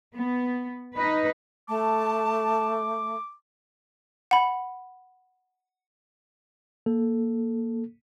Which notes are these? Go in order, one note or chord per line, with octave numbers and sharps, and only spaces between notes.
B3
D#4 B4
A3 A5 D6
F#5 B5
A#3 A4